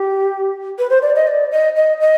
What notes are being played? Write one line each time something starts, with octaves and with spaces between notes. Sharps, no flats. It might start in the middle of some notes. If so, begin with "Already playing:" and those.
Already playing: G4
B4
C5
D5
D#5
D5
D#5
D#5
D#5